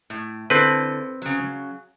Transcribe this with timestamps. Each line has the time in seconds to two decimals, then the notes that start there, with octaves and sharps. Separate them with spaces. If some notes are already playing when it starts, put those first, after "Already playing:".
0.10 A2
0.50 D3 C4 E4 A4 B4
1.22 C#3 F#3